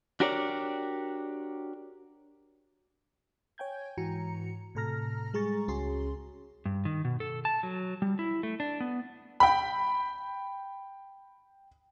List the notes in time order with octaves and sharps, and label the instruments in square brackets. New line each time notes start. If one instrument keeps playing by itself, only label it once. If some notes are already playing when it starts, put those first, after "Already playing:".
[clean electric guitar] D4 F#4 G4 A#4 C#5 D5
[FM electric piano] C#5 G5 G#5 G6 G#6
G#2 E3 F#4 A#5 C#7
A2 C3 A4 A#5 F6 A#6
G3 G#3 G#4 A#5 C#6 A6
C#2 C#4 F#4 G#4 C6
[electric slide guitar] G2
D#3
B2
A4
A5
F#3
G3
E4
A3
D4
B3
[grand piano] G5 B5